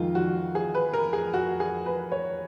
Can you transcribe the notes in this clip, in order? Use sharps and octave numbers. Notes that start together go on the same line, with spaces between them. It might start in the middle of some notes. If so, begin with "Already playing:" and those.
Already playing: F2 D#3 G#3 F4
F#4
G#4
B4
A#4
G#4
F#4
G#4
B4
C#5